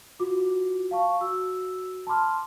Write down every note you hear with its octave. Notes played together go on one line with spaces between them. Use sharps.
F4 F#4 D6
F5 A5 C#6
F#4 E6
A5 B5 C6 D6 F6